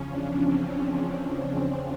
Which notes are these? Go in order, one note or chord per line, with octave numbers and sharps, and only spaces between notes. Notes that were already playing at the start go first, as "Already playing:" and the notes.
Already playing: E2 C#3 F3 C#4
D4
C4